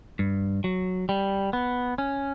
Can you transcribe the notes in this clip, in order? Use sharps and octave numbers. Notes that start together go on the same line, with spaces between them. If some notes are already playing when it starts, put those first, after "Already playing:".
G2
F#3
G3
B3
C#4